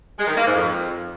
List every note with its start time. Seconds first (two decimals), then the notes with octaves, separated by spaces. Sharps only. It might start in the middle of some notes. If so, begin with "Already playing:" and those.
0.18 G#3
0.27 D#3
0.37 A#3
0.46 G#2
0.55 F2